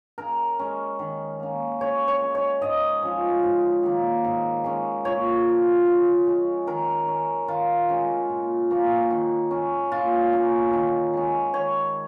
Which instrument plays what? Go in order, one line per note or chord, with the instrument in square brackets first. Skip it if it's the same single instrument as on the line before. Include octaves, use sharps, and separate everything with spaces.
[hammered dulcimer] C#3 A#4
G#3 C#4
D#3
A#3 C#4
C#3 C#5
C#5
G#3 C#4
C#5
G#2 D#5
F3 C#4
G#2
D#3 A#3
G#2
G#3 C#4
A#2 C#5
F3 C#4
C#3
G#3 C#4
D#3 A#4
C#4
D#3 F4
G#3 C#4
A#2
F3 A#3 C#4
D#3
C#4
A#2 F4
A#3 C#4
D#3
G#3 C#4
D#3 C#5